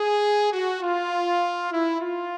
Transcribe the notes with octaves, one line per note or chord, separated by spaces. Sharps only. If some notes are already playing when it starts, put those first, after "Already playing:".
Already playing: G#4
F#4
F4
E4
F4